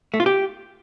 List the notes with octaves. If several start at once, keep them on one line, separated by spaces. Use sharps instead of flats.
A3
F4
G4